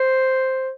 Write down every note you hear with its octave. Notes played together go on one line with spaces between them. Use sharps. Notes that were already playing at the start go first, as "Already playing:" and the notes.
Already playing: C5